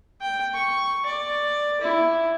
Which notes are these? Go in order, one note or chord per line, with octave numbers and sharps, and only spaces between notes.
G5
C#6
D5
E4